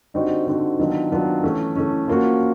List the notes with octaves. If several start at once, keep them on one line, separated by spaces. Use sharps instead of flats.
D3 G3 C4 D#4 F#4
D3 G3 C4 D#4 F#4
D#3 F#3 B3 D4 F4
D#3 F#3 B3 D4 F4
E3 A3 C#4
E3 A3 C#4
F3 A#3 C#4 F#4